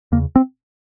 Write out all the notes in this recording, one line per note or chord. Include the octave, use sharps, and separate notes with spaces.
E2 C#3 A#3
C4